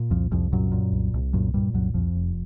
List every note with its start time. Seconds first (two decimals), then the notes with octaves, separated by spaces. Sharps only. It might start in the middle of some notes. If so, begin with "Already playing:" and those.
Already playing: A#2
0.11 C2 F2 F3
0.31 C2 F2 F3
0.53 F#2 A#2 F#3
0.72 A#2
0.92 C2
1.14 C2
1.33 F#2 A#2 F#3
1.54 G2 A#2 G3
1.74 C2 F#2 F#3
1.94 C2 F2 F3
2.15 F1